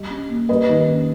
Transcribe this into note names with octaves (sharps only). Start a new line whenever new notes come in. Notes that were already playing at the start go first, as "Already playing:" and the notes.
Already playing: G3 D#5
C#4
A#3
G3 B4 D#5
D#3
C#4